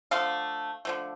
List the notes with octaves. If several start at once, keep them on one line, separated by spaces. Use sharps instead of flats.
D3 F3 A3 F5
D3 F3 A3